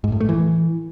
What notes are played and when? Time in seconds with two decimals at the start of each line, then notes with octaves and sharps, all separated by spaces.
0.04 G#2
0.12 A2
0.20 A3
0.29 E3